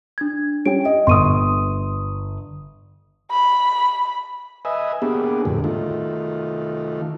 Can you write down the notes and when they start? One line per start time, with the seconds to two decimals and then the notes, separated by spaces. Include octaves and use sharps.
0.18 D4 G#6
0.66 G3 C#4 G5 D7
0.85 D#5
1.07 G1 C6 C#6 D#6 D#7
3.31 B5
4.65 B4 D#5 E5 G#5
5.02 A#3 B3 D4 G4 G#4
5.45 F2 A2 D3
5.64 D#3 A3 F4